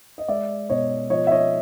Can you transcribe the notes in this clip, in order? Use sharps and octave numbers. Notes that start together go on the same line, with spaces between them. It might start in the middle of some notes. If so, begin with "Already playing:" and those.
D#5
G#3 D5 E5
B2 C#5 D#5
F3 C#5 D#5
E5
C#5 D#5